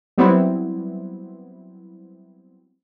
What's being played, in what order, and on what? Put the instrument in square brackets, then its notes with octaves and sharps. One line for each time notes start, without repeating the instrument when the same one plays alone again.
[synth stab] F#3 G3 B3 C4 E4